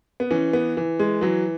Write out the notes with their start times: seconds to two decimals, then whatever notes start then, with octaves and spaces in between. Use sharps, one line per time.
0.20 B3
0.31 E3 C#4
0.53 B3
0.77 E3
0.99 G#3
1.21 E3 F#3